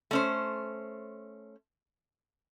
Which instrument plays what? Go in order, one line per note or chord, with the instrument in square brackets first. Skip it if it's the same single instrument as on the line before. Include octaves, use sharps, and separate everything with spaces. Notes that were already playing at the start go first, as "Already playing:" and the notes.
[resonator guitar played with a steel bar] A3 C#4 C5